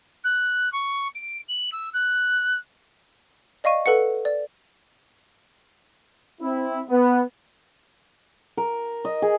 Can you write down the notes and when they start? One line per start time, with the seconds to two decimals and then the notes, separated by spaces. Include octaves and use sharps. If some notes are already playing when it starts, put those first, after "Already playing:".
0.24 F#6
0.72 C#6
1.15 D7
1.48 F#7
1.72 E6
1.93 F#6
3.64 D5 D#5 F5 C#6 D#7
3.86 A4 B4 F#5 C#7
4.25 D5
6.41 C4 E4
6.89 B3
8.57 A#4
9.05 D#5
9.22 G#4